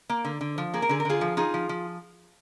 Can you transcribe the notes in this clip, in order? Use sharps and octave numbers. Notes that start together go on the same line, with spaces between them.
A#3
D3
D3
F3
A#3 G#4
A#4
D3 G#4
A#4
D3 F4 G#4
F3
D#4 F4 G#4
F3
F3